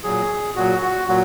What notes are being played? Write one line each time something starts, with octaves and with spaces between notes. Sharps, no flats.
A#2 F#3 G#4
A#2 F#3 F#4
F#4
A#2 F#3 F#4